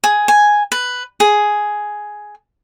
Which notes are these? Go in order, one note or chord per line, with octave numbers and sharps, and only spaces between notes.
G#4
G#5
B4
G#4